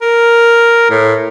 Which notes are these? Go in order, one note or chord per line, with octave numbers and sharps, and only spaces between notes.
A#4
A2